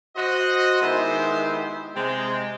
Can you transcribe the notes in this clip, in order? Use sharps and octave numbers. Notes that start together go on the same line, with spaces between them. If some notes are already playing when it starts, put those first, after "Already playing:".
F#4 C5 D#5
D#3 G#3 B3 E4 G4 C5
C3 G#3 G5